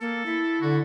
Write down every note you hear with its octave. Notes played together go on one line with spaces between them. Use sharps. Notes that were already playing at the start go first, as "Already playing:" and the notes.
A#3 A4
E4
D3 F#4